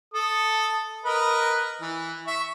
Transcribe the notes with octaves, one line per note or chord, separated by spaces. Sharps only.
A4 A5 D#6
A#4 B4 D#5
E3
E5 C#6